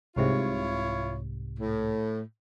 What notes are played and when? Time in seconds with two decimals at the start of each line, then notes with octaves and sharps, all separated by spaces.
0.16 C2 G#2 C3 E4 F4 C#5
1.59 A2